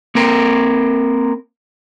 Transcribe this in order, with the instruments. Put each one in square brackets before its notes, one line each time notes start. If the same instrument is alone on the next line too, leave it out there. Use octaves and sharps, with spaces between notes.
[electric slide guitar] A#3 C4 A#4 G5